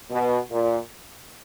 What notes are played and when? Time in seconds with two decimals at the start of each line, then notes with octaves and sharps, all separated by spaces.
0.10 B2
0.51 A#2